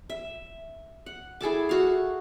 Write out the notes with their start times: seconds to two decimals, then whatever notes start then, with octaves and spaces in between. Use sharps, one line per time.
0.10 E5
1.06 F#5
1.41 E4 G#4 A4 D6
1.69 F#4 F5